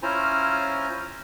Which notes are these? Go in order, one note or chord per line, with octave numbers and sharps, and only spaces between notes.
C#4 E4 F4 C5 G#5 A#5